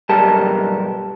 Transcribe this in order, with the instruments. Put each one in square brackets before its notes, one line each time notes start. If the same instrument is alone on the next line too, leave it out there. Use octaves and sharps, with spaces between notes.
[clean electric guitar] B1 G2 G4 A#4 A5